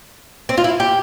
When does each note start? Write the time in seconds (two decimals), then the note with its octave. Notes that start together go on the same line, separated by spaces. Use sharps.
0.49 C4
0.57 F4
0.64 E4
0.80 G4